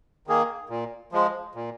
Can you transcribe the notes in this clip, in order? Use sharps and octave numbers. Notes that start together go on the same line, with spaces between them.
D#3 A#3 G#4
A#2
F3 G#3
A#2